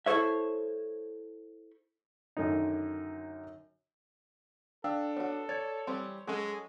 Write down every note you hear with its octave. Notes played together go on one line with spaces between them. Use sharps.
E4 A4 C5 C#5 E5
F#2 D3 D#3 D#4
D4 A4 F5 G5 E6
B3 F#4 C#5
C#5 D5 G#6 A6
E3 G3 C4 C6
F#3 G#3 C#4 A4